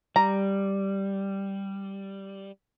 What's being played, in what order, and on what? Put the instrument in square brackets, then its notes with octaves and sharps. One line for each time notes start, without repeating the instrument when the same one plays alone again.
[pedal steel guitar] G3 [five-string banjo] A#5